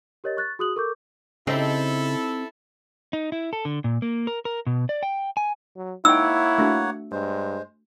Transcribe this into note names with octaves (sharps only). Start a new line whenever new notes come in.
G4 A#4 C#5 D#5 A6
C#6 F#6 A6
F#4 G#4 D#6 F#6 F#7
A4 A#4 C#6 D6 G6
C#3 C4 D#4 E4 G4 A4
D#4
E4
A4
D3
A#2
A#3
A#4
A#4
B2
D5
G5
G#5
F#3
A#3 D#4 E4 C#5 F#5 G5 E6
A3 D4 F#4
G2 G#3 C5